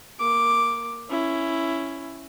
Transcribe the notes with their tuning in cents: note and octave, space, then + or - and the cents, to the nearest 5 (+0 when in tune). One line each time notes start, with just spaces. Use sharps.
A#3 +0 D6 +0
C#4 +0 E4 +10